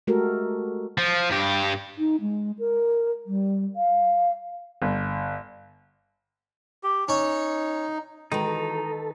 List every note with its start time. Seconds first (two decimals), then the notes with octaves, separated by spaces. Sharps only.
0.07 G#3 A3 F#4 G4 A4 A#4
0.98 F3
1.30 G2 G4
1.98 D#4
2.21 G#3
2.59 A#4
3.26 G3
3.76 F5
4.82 G1
6.83 G4
7.08 C#4 D#4 C#5
8.32 D#3 E3 G#3 D#4 F#4 A4 B4 A#5